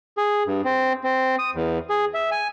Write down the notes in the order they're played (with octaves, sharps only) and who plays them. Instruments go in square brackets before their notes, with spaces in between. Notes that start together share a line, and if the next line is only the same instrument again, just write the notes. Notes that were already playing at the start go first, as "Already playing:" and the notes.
[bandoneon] G#4
G2
C4
C4
D#6
E2
G#4
E5
G#5